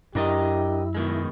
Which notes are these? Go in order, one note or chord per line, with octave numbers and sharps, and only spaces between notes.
F#2 D4 E4 G4 A#4 D#5
B2 D#3 G#3